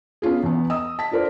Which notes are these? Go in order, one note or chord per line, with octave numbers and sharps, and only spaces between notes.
B3 C#4 F4 G#4
E2 B3
D#5 D#6 E6
A5 B6
D4 F4 A#4 C5 D5